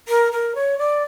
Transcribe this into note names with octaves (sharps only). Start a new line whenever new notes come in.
A#4
A#4
C#5
D5